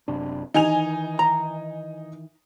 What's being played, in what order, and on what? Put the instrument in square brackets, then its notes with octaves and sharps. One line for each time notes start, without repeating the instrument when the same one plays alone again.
[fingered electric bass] F#1 C3 D4
[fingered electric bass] D#3 E3 [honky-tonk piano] D#4 G#5 F7
[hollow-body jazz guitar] A#5